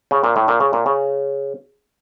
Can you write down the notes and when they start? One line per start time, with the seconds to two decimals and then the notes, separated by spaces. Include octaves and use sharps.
0.11 C#3
0.24 A#2
0.36 A2
0.48 A#2
0.60 C#3
0.73 A#2
0.86 C#3